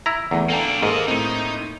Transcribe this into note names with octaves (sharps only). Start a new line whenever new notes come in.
E4 A#5
E2 E3 A3 A#5
A#3 D4 A4 G5 A#5
G#2 A#3 A4 A#4 D#5
A2 A#3 C4 D#4